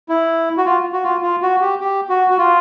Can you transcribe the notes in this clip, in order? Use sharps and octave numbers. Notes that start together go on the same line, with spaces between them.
E4
F#4
F4
F#4
F4
F4
F#4
G4
G4
F#4
F#4
F4